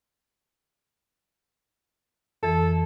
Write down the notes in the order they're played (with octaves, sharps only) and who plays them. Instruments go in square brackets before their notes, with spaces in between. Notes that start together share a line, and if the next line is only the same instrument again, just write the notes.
[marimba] F2 E3 [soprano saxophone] A4